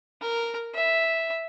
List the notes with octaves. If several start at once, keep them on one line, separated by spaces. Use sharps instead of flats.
A#4
E5